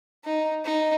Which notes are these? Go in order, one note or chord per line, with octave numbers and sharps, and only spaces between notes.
D#4
D#4